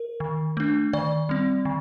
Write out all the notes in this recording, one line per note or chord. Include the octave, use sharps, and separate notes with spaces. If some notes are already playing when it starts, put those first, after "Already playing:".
Already playing: A#4
D#3
A3 D4
D#3 D5
G3 C4
D#3